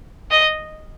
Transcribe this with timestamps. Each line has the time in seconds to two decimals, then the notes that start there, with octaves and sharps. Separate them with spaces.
0.31 D#5